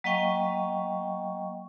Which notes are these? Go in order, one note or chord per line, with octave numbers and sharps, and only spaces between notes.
F#3 A#3 D#5 F5 G5 C#6